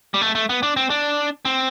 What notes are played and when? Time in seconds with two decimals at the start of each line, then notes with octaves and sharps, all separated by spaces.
0.14 G3
0.21 A3
0.35 A3
0.49 B3
0.63 D4
0.77 C4
0.90 D4
1.45 C4